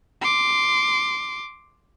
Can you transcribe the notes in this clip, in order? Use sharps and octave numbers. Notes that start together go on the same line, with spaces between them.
C6 D6